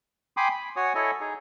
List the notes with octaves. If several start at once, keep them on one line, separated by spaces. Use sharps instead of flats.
G5 G#5 B5 C6 D6 D#6
B5
F#4 C#5 G#5 D#6
E4 A4 C#5 D#5 G#5
D#4 G#4